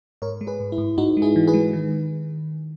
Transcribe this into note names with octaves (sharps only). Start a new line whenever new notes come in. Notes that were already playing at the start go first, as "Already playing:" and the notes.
G#2 A#4 C#5
G#3
G#4 B4
G#2
E4
G#2
G#2 D#4 F#4
G#3
E4 G#4
E3
G#4 B4
G#3
D#3